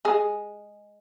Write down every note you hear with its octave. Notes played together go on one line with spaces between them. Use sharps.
G#3 G#4